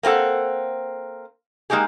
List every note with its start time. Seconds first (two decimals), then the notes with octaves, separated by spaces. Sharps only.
0.03 A#3 C4 F4 A4 F#5
1.70 G#3 A#3 D#4 G4 G#4